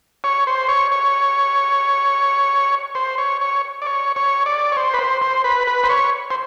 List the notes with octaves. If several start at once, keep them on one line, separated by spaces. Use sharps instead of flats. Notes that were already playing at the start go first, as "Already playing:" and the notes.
C#5
C5
C#5
C#5
C5
C#5
C#5
D5
C#5
C#5
D5
C#5
C5
B4
C5
C5
B4
B4
C5
C#5
C5